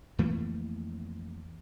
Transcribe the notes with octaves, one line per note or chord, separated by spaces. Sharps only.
F2 E3 A3 A#3